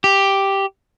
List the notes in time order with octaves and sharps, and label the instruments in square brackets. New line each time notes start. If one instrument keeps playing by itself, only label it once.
[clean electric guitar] G4